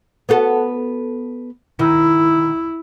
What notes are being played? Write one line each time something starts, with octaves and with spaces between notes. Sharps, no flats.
B3 F#4 A4
D#3 E4